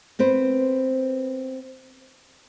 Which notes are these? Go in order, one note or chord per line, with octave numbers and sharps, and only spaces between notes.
B3 C4 B4 C5